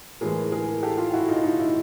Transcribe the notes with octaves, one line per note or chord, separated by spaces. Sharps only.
A2 E3 G#3 G#4 A#4
G#4 A#4
G4 A4
F4 G4
E4 F#4
D#4 F4
D#4 F4
E4